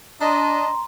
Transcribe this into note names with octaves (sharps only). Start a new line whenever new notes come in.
D4 D#5 A#5 C6